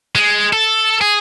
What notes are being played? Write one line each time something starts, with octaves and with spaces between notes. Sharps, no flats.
G#3
A4
G#4